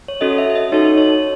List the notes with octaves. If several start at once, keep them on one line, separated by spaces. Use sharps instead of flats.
C#5
C#4 F#4 A4 D#5
E5
E5
D#5
D#4 F#4 A4 C#5
C#5